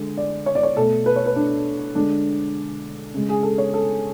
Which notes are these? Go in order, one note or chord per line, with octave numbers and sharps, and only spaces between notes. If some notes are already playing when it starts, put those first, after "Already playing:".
Already playing: D3 G#3
D5
C#5
D5
C#5
B2 A3 A4
B4
C#5
B4
D4
D3 G#3 D4
C#3 G#3
G#4
A4
C#5
A4